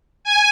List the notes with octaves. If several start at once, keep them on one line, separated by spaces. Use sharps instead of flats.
G#5